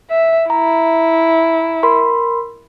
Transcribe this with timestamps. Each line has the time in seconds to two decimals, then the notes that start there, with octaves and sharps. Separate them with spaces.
0.10 E5
0.50 E4 A#5
1.83 A#4 B5 C6